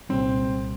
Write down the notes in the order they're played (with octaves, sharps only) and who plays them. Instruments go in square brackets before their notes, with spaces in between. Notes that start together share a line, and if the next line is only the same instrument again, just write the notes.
[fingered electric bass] C2 A#2 G3 [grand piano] C4